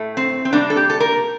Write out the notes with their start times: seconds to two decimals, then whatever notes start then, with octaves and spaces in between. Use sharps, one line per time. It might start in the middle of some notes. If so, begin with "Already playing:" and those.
Already playing: A2 A3
0.17 C4
0.45 C4
0.53 C3 G3 A#3 D4
0.70 A4
0.77 G4
0.90 A4
1.00 A#4